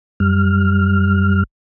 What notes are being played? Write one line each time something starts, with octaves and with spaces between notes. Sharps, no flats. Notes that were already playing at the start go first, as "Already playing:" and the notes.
F#2 G3 F6